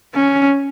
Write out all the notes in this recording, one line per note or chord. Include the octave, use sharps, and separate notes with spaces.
C#4